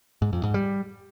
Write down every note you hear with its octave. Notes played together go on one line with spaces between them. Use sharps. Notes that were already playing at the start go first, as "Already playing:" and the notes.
G#2
F2
G#2
G3